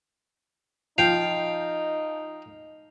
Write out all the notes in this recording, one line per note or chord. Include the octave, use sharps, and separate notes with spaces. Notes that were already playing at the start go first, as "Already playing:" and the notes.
F3 D#4 F5 G5 F7